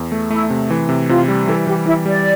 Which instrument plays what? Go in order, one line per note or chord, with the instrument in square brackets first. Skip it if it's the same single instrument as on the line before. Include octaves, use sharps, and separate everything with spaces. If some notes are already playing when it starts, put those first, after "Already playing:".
Already playing: [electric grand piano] E2
A3
[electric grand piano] A3 [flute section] E4
[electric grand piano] C3
E3
C3
[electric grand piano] C3 [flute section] F4
[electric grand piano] G3
[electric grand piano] E3 [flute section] A4
[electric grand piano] E3 [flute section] G4
[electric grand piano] E3 [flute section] E4
[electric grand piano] G3 [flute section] D5